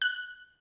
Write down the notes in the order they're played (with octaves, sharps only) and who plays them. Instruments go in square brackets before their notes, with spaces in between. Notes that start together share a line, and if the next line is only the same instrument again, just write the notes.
[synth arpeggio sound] F#6